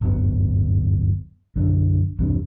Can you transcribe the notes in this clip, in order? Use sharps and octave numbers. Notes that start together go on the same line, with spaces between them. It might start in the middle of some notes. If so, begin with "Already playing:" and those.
D1 G1 F#2 B3
B1 F#2 D3
B1 E2 G2 C3